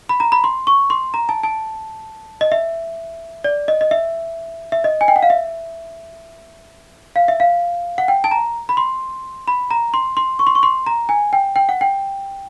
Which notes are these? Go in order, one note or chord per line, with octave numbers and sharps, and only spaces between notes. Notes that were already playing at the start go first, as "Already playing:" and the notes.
B5
A#5
B5
C6
C#6
C6
A#5
A5
A5
D#5
E5
D5
D#5
D#5
E5
E5
D#5
G#5
G5
F#5
F5
E5
F5
E5
F5
F#5
G5
A5
A#5
B5
C6
B5
A#5
C6
C6
C#6
C6
C#6
C6
A#5
G#5
G5
G5
F#5
G5